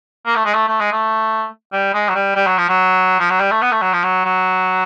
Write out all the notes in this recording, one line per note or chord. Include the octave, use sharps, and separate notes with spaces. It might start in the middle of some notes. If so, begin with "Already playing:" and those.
A#3
A3
G#3
A3
A3
G#3
A3
G3
G#3
F#3
G3
G3
F#3
F3
F#3
F3
F#3
G3
A3
B3
A3
F#3
F3
F#3
F#3